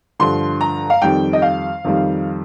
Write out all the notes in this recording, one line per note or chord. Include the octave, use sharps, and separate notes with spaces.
G2 D3 F3 C6
A#5
F5
F2 D#3 G3 G5
D#5
F5
F2 D#3 G3